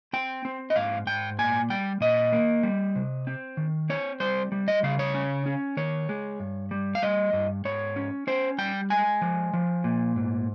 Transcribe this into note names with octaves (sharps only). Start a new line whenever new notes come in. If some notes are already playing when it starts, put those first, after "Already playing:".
C4 G5
C4
D#5
G#2 F5
G#2 G5
A#2 G#5
G3 G5
A#2 D#5
A#3
G3
C3
C4
D#3
C4 C#5
G3 C5
G3
D#5
C#3 F5
C#5
C#4
C#4
D#3 C#5
G#3
G2
G3
F5
G3 D#5
G2
G#2 C#5
C#4
C#4 C5
G3 G5
G#3 G#5
F3
F3
A#2
G#2